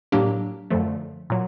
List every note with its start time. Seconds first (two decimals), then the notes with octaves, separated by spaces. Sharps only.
0.12 A2 F#3 A#3 D4 G4
0.71 F#2 D3 F3 A3
1.30 A#2 F#3